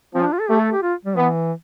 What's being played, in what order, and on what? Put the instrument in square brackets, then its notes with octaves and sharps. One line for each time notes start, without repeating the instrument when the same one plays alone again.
[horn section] F3 [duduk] C4
[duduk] D4
F4
A4
[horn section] A3 [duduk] G4
[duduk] A4
G4
F4
G3
[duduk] E3 [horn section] B3